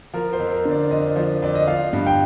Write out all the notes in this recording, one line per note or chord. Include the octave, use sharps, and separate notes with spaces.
F3 A#4
C5
F2
A#4
D3
D5
F2 D#5
F3
F2 D5
D#5
F3 F5
G2
G5